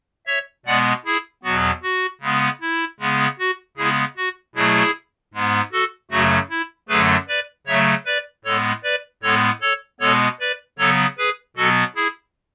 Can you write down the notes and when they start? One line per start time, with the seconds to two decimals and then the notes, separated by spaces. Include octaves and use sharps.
0.27 C#5 E5
0.66 B2 G#3 B3 D5 F#5
1.05 E4 G#4
1.43 E2 B2 F#3 B3 F#4
1.83 F#4
2.21 C#3 G#3 B3
2.61 E4
3.00 C#3 G#3 B3
3.39 F#4
3.77 C#3 G#3 B3 E4 G#4
4.17 F#4
4.55 B2 F#3 A3 E4 G#4
5.34 G#2 G#3 B3
5.72 F#4 A4
6.11 F#2 C#3 F#3 A3 F#4
6.50 E4
6.89 F#2 D3 F#3 A3 G#4 B4
7.28 B4 D5
7.67 C#3 F#3 A3 C#5 E5
8.06 B4 D5
8.45 A2 G#3 B3 A4 C#5
8.83 B4 D5
9.23 A2 G#3 B3 A4 C#5
9.61 A4 C#5
10.00 B2 G#3 B3 A4 C#5
10.40 B4 D5
10.78 C#3 F#3 B3 A4 C#5
11.18 G#4 B4
11.57 B2 F#3 B3 F#4 A4
11.96 E4 G#4